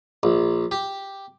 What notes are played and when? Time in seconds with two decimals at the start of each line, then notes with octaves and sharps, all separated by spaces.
0.23 A#1
0.71 G4